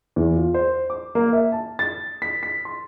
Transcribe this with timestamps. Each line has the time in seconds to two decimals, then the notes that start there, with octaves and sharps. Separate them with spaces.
0.16 E2
0.35 F4
0.54 C5
0.90 D6
1.15 A#3
1.33 E5
1.52 A5
1.79 A6
2.22 B6
2.43 B6
2.65 C6